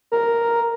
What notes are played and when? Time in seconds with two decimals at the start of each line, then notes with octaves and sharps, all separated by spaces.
0.12 A#4